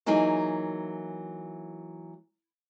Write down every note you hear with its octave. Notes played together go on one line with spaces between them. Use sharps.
E3 F#3 A#3 D#4 G#4